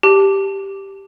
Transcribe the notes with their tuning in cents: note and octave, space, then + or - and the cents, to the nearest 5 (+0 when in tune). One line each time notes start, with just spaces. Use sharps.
G4 +0 A5 +0